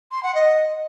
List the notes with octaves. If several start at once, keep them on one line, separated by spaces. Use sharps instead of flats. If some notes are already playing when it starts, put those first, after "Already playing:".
C6
F#5
D#5